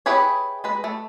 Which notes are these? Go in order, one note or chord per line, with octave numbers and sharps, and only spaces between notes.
E4 G4 G#4 B4 C#5
G#3 B4
A3